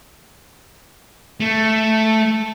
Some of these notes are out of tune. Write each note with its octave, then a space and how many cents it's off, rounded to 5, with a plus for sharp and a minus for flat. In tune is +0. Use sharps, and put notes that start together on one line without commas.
A3 +0